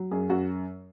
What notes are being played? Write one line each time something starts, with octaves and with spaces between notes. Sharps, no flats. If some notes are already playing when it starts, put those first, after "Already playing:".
Already playing: F#3
F#2 G#4
F#2 F#4